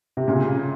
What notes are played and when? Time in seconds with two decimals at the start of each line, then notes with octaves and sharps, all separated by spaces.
0.17 C3
0.28 A#2 C#3